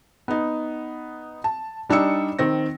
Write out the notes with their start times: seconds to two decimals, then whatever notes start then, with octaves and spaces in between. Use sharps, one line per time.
0.28 B3 D#4
1.44 A5
1.89 G3 D4 D#4 E6 C#7
2.39 D#3 C4 A#6